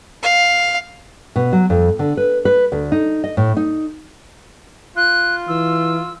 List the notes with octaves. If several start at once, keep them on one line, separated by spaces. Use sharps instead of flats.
F5
B2
F#3
F2
D3
B4
B4
D2
D#4
D#5
A2
D#4
F4 F#6
E3 E6